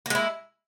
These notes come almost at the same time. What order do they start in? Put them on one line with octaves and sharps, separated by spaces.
A#3 G#3 E4